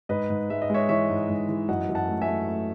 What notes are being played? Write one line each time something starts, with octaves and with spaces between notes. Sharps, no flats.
G#2 B4 D#5
G#2
G#3 E5
D#5
G#3 C#5 E5
E3 C#5 E5
G#2
G#2
E3
F#2 D#5 F#5
F#2
F#5 A5
A3
E5 G#5
A3
A3